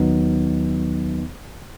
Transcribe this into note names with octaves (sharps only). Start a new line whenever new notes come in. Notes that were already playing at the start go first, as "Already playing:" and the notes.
Already playing: D#2 D#3 F#3 B3 D#4